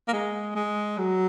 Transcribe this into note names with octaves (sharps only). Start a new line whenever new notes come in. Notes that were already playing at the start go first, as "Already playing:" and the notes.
A#3
G#3
G#3
F#3